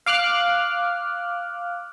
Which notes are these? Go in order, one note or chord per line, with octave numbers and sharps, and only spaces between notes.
F5 D6 F6 F#6